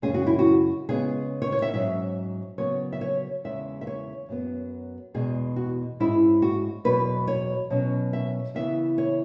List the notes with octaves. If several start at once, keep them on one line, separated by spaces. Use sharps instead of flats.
F#2 C#3 G#3 C#4 G#4
F#4
E4
F#4
C#3 G#3 B3 G#4
C#5
C#5
E5
G#2 F#3 C#4 E5
C#3 F#3 B3 C#5
E5
C#5
E2 C#3 G#3 E5
E5
C#5
F#2 F#3 B3
E2 B2 G#3 G#4
F#4
G#2 G#3 C#4 E4
F#4
E2 B2 F#3 B4
C#5
B2 F#3 C#4
E5
C#3 E3 B3 E5
C#5